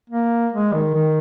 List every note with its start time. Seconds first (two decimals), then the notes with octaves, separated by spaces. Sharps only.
0.10 A#3
0.53 G#3
0.74 D#3
0.94 D#3